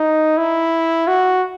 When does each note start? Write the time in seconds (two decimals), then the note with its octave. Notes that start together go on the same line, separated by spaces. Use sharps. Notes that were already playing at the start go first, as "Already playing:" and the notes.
Already playing: D#4
0.38 E4
1.07 F#4